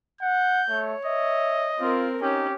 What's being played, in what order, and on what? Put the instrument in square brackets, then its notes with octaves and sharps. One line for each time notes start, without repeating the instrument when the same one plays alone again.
[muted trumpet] F#5 [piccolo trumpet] G6
[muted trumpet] A3 [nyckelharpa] C#5
[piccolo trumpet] D#5 [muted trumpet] E5
[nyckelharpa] C4 A#4 [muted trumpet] F4
[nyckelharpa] C#4 [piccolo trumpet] D#4 [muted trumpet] G4